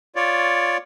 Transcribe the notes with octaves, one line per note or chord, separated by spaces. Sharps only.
F4 C#5 D5